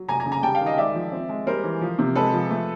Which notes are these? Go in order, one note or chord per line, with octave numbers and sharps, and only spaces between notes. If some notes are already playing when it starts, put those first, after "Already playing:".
Already playing: F#3
F1 G#5 A#5
G#5 A#5
C#3
G#5 A#5
G3 G5 A5
F5 G5
D#3
D#5 F5
G#3 D5 E5
F3
C4
G#3
G3 A#4 C5
E3
F3
C3
G#3 A4 B4
F3
A3